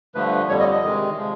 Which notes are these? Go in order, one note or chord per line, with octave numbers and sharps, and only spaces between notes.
G2 D3 F3 A3 B4
F2 D3 G3 C#5
D#5
D#5
C3 D#3 G#3
C3 F3 G#3